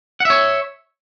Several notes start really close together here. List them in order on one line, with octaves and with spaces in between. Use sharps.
F#5 E5 C#5